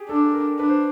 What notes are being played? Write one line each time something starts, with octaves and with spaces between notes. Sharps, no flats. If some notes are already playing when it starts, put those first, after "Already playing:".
Already playing: G4 G#4
D4 A4
A#4
D4 B4
C5